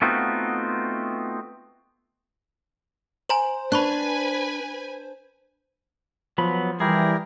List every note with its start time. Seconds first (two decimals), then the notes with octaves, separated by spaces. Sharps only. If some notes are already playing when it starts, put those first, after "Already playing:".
0.02 A3 B3 C4 D#4 F4 F#4
3.29 C5 G#5 A#5 F#7
3.72 D4 B4 G#5 B5 C#6 F#6
6.38 F3 F#3 B3 B5
6.80 E3 G3 E4 G4 G#4 A#4